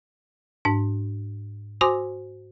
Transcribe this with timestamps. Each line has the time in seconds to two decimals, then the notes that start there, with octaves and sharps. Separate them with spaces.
0.65 G#2 D4
1.81 F#4 C5 G#5 C6 D6 D#6